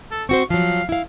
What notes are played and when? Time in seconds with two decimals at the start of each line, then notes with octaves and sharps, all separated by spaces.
0.11 A4
0.29 C4 F#4 C5 C#6
0.50 F3 F#3 F5
0.89 E4 F5